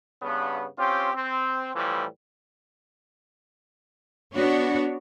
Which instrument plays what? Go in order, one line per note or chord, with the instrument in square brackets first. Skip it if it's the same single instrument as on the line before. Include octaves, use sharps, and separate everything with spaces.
[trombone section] G2 C#3 B3
C4 C#4 F4 G4
C4
A2 E3 F3 G3
[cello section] B3 D4 F#4 C#5